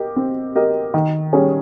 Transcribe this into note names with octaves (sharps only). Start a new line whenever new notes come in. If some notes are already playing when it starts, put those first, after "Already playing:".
Already playing: G4 A#4 D#5
C4
G4 A#4 D#5
D#3
G3 C#4 G#4 C#5